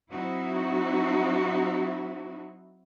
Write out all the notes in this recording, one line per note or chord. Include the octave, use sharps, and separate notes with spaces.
F#3 C4 D#4 E4 F#4